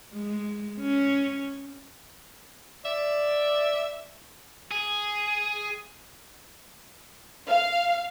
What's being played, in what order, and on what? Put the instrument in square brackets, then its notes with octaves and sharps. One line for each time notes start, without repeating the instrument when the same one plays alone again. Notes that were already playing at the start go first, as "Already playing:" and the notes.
[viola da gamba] G#3
C#4
[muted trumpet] D5 [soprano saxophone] E5
[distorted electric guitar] G#4
[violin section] F5